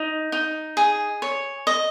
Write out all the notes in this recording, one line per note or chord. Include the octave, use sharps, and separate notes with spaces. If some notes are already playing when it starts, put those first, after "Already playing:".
Already playing: D#4
D#4
G#4
C#5
D#5